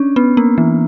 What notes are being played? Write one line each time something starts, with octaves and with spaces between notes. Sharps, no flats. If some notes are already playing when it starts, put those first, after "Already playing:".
Already playing: C#4 D4
B3
A#3
E3